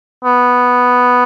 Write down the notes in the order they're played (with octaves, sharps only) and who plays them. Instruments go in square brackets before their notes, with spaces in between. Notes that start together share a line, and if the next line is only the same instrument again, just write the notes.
[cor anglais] B3